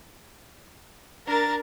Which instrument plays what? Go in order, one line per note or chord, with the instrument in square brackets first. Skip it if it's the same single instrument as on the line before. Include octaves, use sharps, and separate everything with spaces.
[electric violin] D4 A6 [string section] A#4